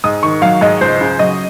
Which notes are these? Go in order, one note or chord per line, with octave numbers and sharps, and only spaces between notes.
G#2 D#6
D#3 C#6
F#3 F5
G#2 D#5
C#2 C5
C#3
F#3 D#5